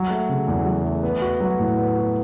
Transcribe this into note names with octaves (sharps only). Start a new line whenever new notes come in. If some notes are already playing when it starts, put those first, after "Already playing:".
Already playing: F#3
A3
C#3
E2
F#3
A3
B3
F#4
F#3
A2
B3
F#4